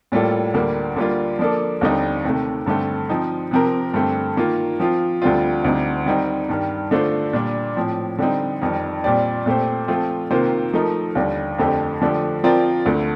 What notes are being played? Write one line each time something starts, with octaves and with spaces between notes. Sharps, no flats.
A2 G3 A#3 F4 A4
D2 D3 G3 A#3
D3 G3 A#3 F4
F3 A#3 D4 A4
D#2 D3 G3 C4 D#4
C3 D#3 A3
G2 D3 A3 C4
F3 C4 D#4
C3 F3 C4 G4 A#4
G2 D3 A3 C4 G4
D#3 A#3 F4
F3 C4 F4
D2 D3 G3 C4 F4
D2 D3 G3 C4 D#4
D#3 G3 C4 D#4
G2 D#3 G3
D3 A3 D4 F4 C5
A#2 G3 D4
A2 F3 C4
D3 G3 C4 D#4
F2 D#3 G3
A#2 G3 C4 G4 D5
A#2 A3 C4 G4 C5
F3 A3 C4 F4
C3 D#3 A#3 F4 C5
F3 A3 D#4 A#4
D#2 D3 G3
F2 D3 A3 C4 G4
D3 F3 A3 D4 G4
F3 C4 F4 A#4 D5
D2 D3 A3